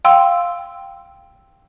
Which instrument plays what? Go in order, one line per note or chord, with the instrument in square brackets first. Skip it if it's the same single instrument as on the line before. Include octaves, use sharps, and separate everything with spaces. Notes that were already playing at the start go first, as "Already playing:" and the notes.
[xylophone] F5 G5 C6 E6